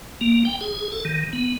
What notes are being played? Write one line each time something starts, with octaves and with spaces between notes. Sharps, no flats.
A#3
G5
G#4
A4
D#3
B3